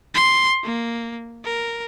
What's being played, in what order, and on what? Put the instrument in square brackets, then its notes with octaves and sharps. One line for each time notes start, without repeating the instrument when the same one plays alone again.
[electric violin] C6
A#3
A#4